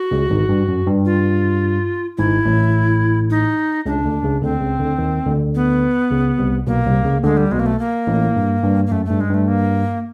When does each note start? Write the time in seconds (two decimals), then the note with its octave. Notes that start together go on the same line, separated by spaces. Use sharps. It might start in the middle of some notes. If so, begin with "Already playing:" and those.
Already playing: F#4
0.11 C#2 C#3
0.30 G#1 G#2
0.49 G2
0.68 F#2
0.86 G2
1.05 F4
2.17 G#1 G#2 E4
2.45 A1 A2
3.30 D#4
3.86 C#2 C#3 D4
4.04 D2 D3
4.24 C#2 C#3
4.42 D2 D3 C4
4.61 C#2 C#3
4.79 D2 D3
4.98 D#2 D#3
5.26 D2 D3
5.55 B3
6.10 C#2 C#3
6.39 C2 C3
6.67 B1 B2 A#3
6.86 C2 C3
7.04 C#2 C#3
7.23 D2 D3 G#3
7.37 G3
7.52 B1 B2 G#3
7.59 A#3
7.66 A3
7.79 A#3
8.07 A1 A2
8.36 G2
8.64 G2
8.86 A#3
8.91 F#2 A3
9.06 A3
9.11 G2
9.20 G#3
9.30 G2 A3
9.48 A#3